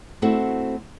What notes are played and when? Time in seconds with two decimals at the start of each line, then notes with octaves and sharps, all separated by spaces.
0.22 A3 C4 E4 F#4 A4